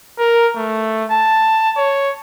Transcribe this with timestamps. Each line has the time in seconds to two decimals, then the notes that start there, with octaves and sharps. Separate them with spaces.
0.19 A#4
0.56 A3
1.11 A5
1.77 C#5